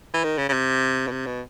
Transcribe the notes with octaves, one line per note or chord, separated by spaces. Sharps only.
E3
D#3
C#3
C#3
C3
B2
C3
B2